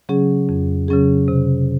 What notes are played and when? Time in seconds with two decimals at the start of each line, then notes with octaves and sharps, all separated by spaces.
0.09 C#3 F#3 C#4 G#4
0.49 F2
0.88 C#3 F#3 C#4 G#4
1.28 C3